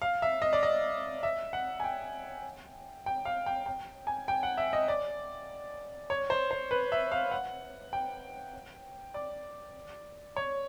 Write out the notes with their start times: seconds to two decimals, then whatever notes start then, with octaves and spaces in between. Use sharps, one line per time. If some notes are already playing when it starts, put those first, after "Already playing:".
0.02 F5
0.22 E5
0.42 D#5
0.53 D5
0.63 D#5
1.23 E5
1.53 F#5
1.80 G#5
1.84 G5
3.06 G5
3.25 F5
3.46 G5
3.66 G5
4.07 G#5
4.28 G5
4.43 F#5
4.57 E5
4.73 D#5
4.88 D5
6.10 C#5
6.30 C5
6.51 C5
6.71 B4
6.92 E5
7.12 F5
7.31 F#5
7.93 G5
9.14 D5
10.36 C#5